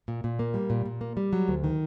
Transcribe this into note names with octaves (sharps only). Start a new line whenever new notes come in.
A#2
A#2
A#3
G3
A#2
A#2
A#3
G3
F#3
D2
D#3